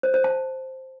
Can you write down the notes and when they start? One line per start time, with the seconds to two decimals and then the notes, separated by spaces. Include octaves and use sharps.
0.03 C5
0.14 C5
0.24 A5